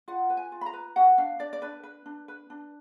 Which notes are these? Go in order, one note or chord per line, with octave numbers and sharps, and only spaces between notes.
F4 F#5
B4
G#5
F4
B5
A#5
B4
F#4 F#5
D4 F5
D4 D5
D5
D4 B4
B4
D4
B4
D4